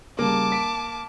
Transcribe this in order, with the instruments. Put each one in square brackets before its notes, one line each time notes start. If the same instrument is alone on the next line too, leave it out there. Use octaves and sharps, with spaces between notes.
[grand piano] C#3 G3 [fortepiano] A#3 [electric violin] A5 D6
[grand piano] B6 D7